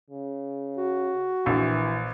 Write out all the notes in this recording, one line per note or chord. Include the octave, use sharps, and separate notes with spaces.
C#3
F#4
A#1 E3